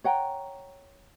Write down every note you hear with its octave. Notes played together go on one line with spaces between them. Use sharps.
C#5 F#5 G5 A#5